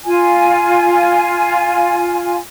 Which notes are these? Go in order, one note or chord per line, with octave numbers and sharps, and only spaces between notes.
F4 G#5